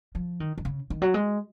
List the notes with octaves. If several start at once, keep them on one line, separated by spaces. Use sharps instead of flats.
F3
D#3
D#3
C#3
D#3
F#3
G#3